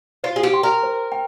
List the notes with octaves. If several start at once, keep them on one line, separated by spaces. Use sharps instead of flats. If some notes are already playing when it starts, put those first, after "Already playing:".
F4 C5
G#4
G4
G5 C6
A#4
C5
G5